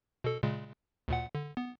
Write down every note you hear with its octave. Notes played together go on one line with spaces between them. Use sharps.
B2 A4
A#2 C#3 G#3
D2 A#2 F#5
D3
B3